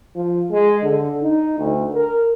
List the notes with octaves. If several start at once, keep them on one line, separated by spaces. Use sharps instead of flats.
F3
G#3
D3
D#4
D2
A#4